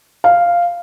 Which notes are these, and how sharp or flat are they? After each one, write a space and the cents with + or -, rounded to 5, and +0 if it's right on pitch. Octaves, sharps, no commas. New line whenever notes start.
F5 -5